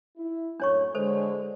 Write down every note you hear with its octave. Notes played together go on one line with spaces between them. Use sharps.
E4
F#2 A2 D4 C#5 C#6
D3 G#3 A4 C5